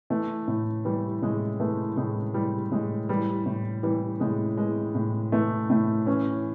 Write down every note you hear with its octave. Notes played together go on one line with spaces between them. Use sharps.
E3 A3
A2
E3 G3
A2 G#3
E3 A3
A2 G#3
E3 G3
A2 G#3
E3 G3
A2
E3 G3
A2 G#3
E3 G#3
A2
E3 A3
A2 A3
E3 C#4